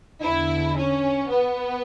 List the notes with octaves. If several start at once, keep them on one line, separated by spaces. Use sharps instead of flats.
E2 D3 E4
C#4
B3